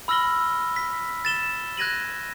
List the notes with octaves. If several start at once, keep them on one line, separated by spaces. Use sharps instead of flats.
B5 E6 F6 A#6 F#7 G7
B6
A6 E7 G7
F#6 G#6 A#6 D#7 F#7